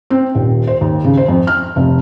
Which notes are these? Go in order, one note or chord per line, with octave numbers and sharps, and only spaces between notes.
C4
D#1
C5
D#2
C#3
C5
F2
F6
F1